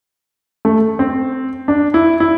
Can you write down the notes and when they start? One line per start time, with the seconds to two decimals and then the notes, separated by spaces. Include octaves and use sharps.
0.65 A3
0.99 C4
1.68 D4
1.94 E4
2.20 E4